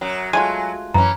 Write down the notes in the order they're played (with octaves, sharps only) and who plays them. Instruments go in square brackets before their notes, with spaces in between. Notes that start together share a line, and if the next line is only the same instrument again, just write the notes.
[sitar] F#2 F#3
[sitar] F#3 [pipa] G#3 A3 F4 [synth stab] G#5
[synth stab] F#2 [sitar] E3 C#4 [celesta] A#5